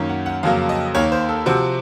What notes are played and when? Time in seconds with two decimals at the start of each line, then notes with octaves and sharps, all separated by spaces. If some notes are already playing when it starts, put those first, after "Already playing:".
Already playing: F#2 D#3 A#3 C#4
0.09 F#5
0.26 F#5
0.43 F2 C#3 F#3 A#3 F5
0.69 D#5
0.95 D#2 D#3 A#3 C#5
1.12 C5
1.29 A4
1.46 C3 F3 C4 F#4